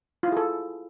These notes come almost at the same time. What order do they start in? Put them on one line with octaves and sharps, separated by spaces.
F4 E4 G#4 A4